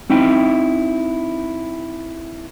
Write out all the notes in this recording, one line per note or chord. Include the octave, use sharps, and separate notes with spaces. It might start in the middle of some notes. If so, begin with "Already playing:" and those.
C4 D#4 E4 E5 G5